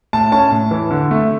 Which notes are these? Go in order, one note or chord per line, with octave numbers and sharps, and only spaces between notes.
A2 A5
C#4 A5
A2
E3
D3
A3